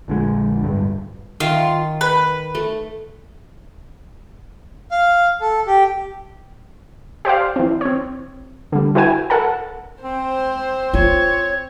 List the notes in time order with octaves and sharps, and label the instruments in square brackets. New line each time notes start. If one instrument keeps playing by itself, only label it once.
[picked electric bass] A#1 D3 G#3
D1 G2
[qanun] D#3 [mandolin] F4
[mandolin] B4
[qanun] A3
[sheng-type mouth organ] F5
A4
G4
[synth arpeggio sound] G4 C5 D5 F5
E3 C4
C4 C#5
D3 G3
E4 F#4 B4 G5 G#5
A4 A#4 F#5 A5
[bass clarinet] C4 [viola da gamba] C5
[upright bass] F4 [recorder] C#5